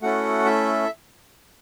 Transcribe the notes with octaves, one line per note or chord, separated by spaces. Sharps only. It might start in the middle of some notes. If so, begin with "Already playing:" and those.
A3 C#4 E4 F#4 A4 F#5
E4 E5